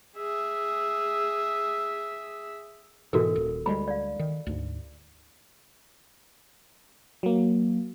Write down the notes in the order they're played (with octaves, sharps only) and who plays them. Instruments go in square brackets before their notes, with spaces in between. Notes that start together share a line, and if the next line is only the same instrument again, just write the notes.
[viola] G#4 E5
[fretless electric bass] G#2 B2 E3 [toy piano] F#4 A4 A#4
[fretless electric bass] D#1
[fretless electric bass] D2 G3 G#3 [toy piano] B5
[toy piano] D5 F5
[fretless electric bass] D#3
D2 G#2
[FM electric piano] F#3 A#3